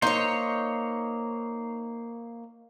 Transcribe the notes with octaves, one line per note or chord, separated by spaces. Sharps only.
A#3 D#4 C5 C#5